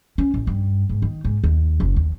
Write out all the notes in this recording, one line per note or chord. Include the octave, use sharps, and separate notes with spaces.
C#4
A1
G2
G#2
D#3
G#2
D#2
F#1
D#2